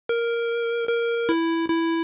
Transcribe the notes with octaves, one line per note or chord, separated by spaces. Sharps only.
A#4
A#4
E4
E4